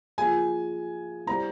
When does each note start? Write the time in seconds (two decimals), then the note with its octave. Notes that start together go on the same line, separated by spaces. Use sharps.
0.18 F3 A#3 F4 G#4 G#5
1.27 G3 C4 E4 G4 A#5